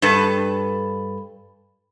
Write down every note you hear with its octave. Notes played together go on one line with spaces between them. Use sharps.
G2 A4 B4